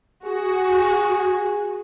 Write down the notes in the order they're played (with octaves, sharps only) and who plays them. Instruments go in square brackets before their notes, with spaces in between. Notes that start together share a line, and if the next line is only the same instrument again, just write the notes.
[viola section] F#4 [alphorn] G#4